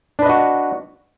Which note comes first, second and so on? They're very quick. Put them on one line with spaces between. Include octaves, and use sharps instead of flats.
D4 B4 D#5 F#4